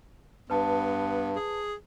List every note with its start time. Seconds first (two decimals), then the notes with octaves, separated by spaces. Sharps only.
0.50 G2 B3 B4 A5
1.36 G#4